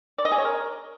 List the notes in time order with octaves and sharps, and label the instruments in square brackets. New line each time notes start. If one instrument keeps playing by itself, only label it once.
[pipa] D5
D#5
G#4
C#5
A#4